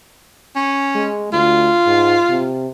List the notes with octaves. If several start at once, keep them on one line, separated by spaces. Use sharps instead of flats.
C#4
G#3
D2 F4
G#2
C3